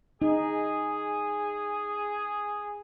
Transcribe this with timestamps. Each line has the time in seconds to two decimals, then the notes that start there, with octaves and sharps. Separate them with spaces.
0.22 D#4 G#4